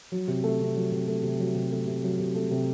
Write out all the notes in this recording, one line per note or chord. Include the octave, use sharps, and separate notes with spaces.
F#3
C3
A3
C3
F#3
C3
A3
C3
F#3
C3
A3
C3
F#3
C3
A3
C3